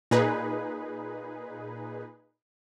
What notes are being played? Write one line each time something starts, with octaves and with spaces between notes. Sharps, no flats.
A#2 D#4 G#4 B4